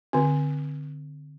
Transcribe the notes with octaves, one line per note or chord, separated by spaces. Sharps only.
D3 C4